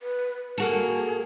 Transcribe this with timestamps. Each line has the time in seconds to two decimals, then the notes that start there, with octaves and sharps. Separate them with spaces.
0.01 B4
0.58 A#3 F#4 G#4 A4